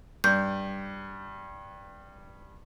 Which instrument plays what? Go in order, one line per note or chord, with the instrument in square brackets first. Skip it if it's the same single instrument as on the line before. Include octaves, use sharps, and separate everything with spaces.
[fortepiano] G2 [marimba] G6